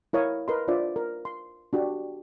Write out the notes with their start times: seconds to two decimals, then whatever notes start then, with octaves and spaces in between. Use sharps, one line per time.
0.13 E4 A#4 C#5 F5 D#6
0.48 A#4 B4 D#5 A#5 C6
0.68 D4 F4 C5 D5 E5
0.96 A#4
1.25 C6
1.73 D4 F#4 G4